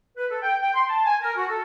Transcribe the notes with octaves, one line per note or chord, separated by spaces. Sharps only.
B4
A4
G5
G5
C6
A5
G#5
A#4
F#4
A4